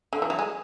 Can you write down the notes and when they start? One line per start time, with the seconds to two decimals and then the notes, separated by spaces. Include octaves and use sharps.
0.13 D3
0.22 E3
0.30 F#3
0.39 G#3